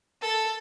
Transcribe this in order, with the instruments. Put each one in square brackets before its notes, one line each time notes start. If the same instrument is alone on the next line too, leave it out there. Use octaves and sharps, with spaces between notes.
[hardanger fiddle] A4